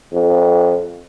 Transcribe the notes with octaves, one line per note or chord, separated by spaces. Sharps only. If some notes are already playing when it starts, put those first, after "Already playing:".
F2